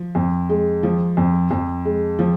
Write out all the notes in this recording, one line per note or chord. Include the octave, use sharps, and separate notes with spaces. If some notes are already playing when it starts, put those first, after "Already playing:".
Already playing: F3
F2
G#3
F3
F2
F2
G#3
F3